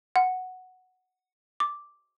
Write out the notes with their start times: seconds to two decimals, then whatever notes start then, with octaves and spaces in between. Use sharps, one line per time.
0.16 F#5
1.60 D6